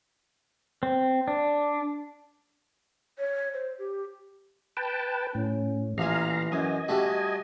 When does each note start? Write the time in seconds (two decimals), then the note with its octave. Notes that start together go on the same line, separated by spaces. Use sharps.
0.83 C4
1.28 D4
3.19 C#5
3.54 C5
3.79 G4
4.77 B4 G5 A5
5.35 A2 C#4
5.98 A1 A#2 E3 F5 G#5 A#5
6.52 F#2 D#5 G#5
6.88 G3 A3 F#4